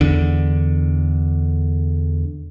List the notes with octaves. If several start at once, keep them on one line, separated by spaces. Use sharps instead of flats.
E2 D3